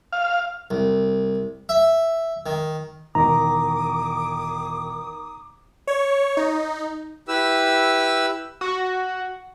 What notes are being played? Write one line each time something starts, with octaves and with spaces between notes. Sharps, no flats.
F5
C2
E5
D#3
E1 D#3 A#5 D6 D#6
C#5
D#4
E4 G4 B4 E6
F#4